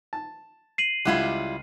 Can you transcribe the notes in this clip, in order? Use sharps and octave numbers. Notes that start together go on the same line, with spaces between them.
A5
C7 D#7 F#7
C#2 G3 E4 F4 F#5 F#6